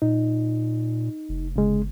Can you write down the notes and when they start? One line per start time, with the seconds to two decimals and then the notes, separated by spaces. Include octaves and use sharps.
0.02 A#2 D#4
1.29 F1
1.56 G1 C#3 G#3